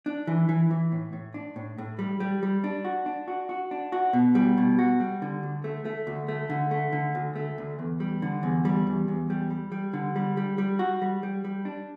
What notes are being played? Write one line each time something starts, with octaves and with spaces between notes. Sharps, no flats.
D4
E3
E3
E3
A2
A2
D4
A2
A2
G3
G3
G3
D4
F#4
D4
F#4
F#4
D4
F#4
B2
G3
B2
F#4
G3
D3
D2
A3
A3
D2
A3
D3
A3
D3
D2
A3
D2
E2
G3
D3
E2
G3
E2
E2
G3
G3
G3
D3
G3
G3
G3
F#4
G3
G3
G3
D4